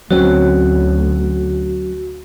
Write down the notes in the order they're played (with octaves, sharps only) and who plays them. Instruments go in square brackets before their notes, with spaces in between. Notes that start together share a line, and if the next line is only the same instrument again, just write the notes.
[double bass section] D2 [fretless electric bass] F#3 C4 C#4 [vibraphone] F#4